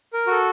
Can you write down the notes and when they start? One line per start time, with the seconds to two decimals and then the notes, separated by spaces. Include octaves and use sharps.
0.13 A#4
0.27 F#4 A4